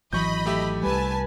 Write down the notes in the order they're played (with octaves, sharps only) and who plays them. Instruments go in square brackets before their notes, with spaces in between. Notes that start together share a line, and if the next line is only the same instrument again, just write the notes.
[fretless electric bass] G#1 E3 F#3 [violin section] D#5 B5 [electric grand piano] C#6 G6
[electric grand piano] A3 G4 E5
[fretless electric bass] C2 G3 [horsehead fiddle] B4 [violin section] G#5 A5